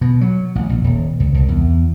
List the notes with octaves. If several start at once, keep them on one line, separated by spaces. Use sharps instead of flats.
B2
F#3
A1
A#1
D#1
C#2
C2
E2